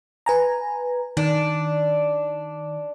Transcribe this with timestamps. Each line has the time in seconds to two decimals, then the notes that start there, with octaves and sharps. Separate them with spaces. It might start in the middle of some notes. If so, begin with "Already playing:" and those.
0.26 B4 G#5 A#5
1.17 D#3 D4